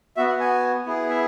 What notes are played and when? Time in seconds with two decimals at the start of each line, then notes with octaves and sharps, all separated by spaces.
0.17 B3 F#4 E5
0.29 F#5
0.40 G#5
0.85 B3 E4 G#4
1.09 E5